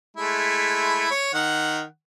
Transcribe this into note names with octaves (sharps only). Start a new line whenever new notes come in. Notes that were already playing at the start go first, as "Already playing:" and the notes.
G#3 A3 E4
C#5
D#3 F#5